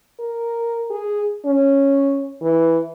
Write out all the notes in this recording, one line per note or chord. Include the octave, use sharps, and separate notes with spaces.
A#4
G#4
C#4
E3